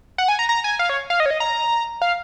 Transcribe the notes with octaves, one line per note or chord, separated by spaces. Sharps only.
F#5
G#5
A#5
A#5
G#5
F5
C#5
F5
D#5
C#5
D#5
A#5
F5